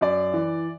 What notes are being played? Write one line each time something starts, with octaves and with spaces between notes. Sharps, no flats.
F#2 D5
E3